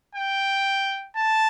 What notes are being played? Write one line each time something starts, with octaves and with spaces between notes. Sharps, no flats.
G5
A5